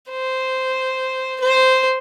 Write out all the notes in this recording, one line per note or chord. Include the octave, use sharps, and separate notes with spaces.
C5
C5